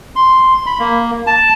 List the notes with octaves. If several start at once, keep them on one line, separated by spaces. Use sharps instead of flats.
C6
B5
A#3
A5